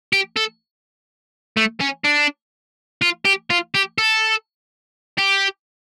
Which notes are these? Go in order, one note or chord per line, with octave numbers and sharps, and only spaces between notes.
G4
A4
A3
C#4
D4
F4
G4
F4
G4
A4
G4